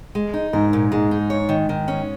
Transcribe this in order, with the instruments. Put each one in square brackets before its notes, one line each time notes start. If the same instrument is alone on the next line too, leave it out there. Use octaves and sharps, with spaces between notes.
[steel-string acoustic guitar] G#3
D#4
[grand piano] G#2 [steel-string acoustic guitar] A#4
[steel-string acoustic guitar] A#2
[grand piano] G#2 [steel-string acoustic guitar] G#3
[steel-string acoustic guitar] D#4
C#5
D#3
D#3
C#4